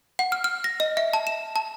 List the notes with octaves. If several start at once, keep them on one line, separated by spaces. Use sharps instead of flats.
F#5
F6
F6
A#6
D#5
E5
A5
E7
A5